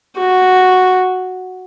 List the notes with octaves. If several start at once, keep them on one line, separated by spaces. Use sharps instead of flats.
F#4